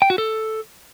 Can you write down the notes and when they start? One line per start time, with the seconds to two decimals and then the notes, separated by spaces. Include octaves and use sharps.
0.02 G5
0.10 F#4
0.18 A4